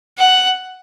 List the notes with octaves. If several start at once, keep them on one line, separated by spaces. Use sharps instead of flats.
F#5